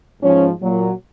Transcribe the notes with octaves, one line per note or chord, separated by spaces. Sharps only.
G#2 F3 C#4
A#2 F#3